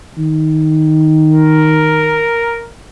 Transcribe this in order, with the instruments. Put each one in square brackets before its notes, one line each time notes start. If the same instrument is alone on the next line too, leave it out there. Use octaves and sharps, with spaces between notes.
[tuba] D#3
[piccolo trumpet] A#4